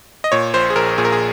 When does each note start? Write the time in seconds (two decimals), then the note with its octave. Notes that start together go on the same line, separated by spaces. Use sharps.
0.24 D#5
0.32 A#2 C#5
0.54 A#1 C5
0.70 G#4
0.76 A#1 A#4
0.98 A#2 G#4
1.05 A#4
1.12 G#4